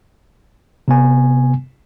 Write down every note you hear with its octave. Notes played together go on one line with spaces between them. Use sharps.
C3 B3 G#5